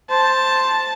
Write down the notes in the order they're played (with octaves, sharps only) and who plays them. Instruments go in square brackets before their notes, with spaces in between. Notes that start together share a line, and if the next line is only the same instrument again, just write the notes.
[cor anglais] C5 [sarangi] A5